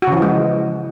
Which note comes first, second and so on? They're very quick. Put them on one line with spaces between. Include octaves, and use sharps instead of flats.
F#4 C#3 E3 F3 G#3